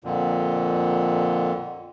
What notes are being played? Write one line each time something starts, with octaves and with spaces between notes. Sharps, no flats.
F2 A#2 D3